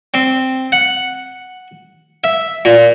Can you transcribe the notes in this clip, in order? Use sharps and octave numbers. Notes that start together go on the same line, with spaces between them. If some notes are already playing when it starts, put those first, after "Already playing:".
C4
F#5
E5
A#2